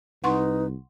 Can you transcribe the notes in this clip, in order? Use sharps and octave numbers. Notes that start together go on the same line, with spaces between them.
C2 D#4 B4 F#5 C6 C#6